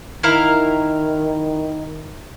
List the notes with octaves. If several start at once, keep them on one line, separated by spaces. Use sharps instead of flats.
D#3 E4 A#4 F5